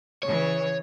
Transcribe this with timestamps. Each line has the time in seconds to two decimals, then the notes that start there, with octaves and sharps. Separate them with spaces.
0.23 C#3 E3 C#5